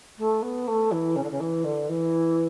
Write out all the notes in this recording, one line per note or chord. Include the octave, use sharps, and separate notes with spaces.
A3
B3
A3
E3
C#3
D3
C#3
E3
D3
E3